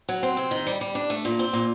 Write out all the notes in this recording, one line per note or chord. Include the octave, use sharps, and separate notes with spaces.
F#3
C4
C3
D#3
G3
G3
D4
A3
A#2
C4
A#2